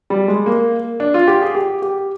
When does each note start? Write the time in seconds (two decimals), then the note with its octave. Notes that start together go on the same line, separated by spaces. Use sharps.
0.10 G3
0.28 G#3
0.46 A#3
1.00 D4
1.14 F4
1.28 G4
1.41 G#4
1.55 G4
1.82 G4